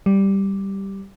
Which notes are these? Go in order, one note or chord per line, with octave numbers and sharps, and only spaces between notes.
G3